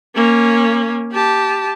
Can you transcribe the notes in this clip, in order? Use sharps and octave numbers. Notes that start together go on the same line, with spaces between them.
A#3 C#4
G4 A5